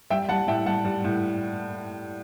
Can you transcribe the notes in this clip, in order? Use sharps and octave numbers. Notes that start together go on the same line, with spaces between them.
G3 E5 G5
G3 F#5 A5
A2 E5 G5
G3 F#5 A5
G3
A2